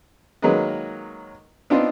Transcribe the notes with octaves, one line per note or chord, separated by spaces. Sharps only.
D#3 F#3 G#3 A#3 B4 D#5
B3 C4 D4 D#4 F4 D#5